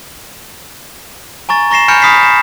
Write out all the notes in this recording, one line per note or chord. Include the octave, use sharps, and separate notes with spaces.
G#5 A#5 C#6 A6
A#5 C#6 A#6 C7 E7
G#5 A#5 B5 F6 G6 C#7
B5 D#6 F6 B6 C7
E7